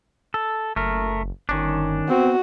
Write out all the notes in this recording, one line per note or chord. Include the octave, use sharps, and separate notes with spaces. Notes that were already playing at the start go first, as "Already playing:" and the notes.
A4
F#1 A3 A#4
G1 D#3 C#4 D4
B3 C4 F#4